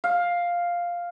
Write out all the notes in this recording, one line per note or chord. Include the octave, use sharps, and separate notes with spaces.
F5